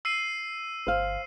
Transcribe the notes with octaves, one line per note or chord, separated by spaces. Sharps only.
E6 C7 D#7
G1 C5 F5